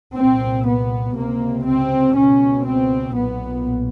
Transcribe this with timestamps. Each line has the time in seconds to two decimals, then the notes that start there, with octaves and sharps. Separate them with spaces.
0.16 C2 A#2 C4
0.67 B3
1.16 C#2 C3 A#3
1.66 C4
2.16 C#2 B2 C#4
2.66 C4
3.15 B1 A#2 B3